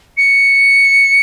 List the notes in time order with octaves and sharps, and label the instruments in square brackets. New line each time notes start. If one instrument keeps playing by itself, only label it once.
[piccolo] C#7